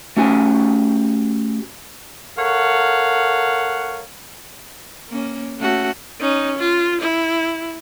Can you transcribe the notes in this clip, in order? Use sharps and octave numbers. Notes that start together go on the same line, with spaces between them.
A3 C#4 F#4 G4 G#5
A4 A#4 C#5 F5 F#5
A#3 C#4
A3 C#4 F#4
C#4 D#4
F4
E4